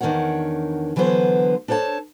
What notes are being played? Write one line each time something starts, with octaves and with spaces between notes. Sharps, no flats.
E2 D#3 D4 A#4 C#5 F#5
D3 E3 F#3 B3 C5
D4 A4 C5 C#5 A5